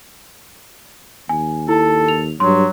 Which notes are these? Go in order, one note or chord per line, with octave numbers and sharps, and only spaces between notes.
D#2 G#5
E4 A4
F7
G2 F#3 C6